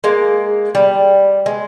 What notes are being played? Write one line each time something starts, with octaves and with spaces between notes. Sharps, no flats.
G#3 A#3
G3
G#3